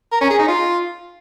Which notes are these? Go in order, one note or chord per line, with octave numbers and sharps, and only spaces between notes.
A#4
C#4
G#4
D#4
F4